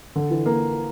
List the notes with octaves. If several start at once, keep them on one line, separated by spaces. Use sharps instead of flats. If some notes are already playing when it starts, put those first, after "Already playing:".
D3
E3
A#3